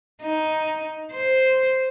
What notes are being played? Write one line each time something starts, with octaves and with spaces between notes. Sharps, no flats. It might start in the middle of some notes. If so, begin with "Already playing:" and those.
D#4
C5